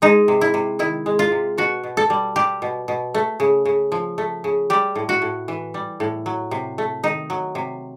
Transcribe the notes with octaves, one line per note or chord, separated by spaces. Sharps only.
G#3 D#4
C3
E4
C3
D#3 E4
G#3
F4
C3
B2 F#4
B2
A4
G3
G3 G4
B2
B2
A3
C#3
C#3
F3
A3
C#3
G3 G4
A2
F#4
A2
E3
G3
A2
F#3
C3
A3
D#3 D#4
F#3
C3